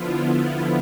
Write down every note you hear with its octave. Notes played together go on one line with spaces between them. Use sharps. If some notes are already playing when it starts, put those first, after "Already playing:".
Already playing: D3 F3 B3 E4 F4
F4